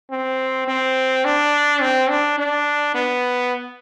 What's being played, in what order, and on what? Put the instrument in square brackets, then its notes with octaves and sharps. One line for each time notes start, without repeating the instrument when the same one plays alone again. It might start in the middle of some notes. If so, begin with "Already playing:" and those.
[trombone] C4
C4
D4
C4
D4
D4
B3